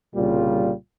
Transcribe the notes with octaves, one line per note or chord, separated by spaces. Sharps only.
C2 A#2 C#3 G3 F4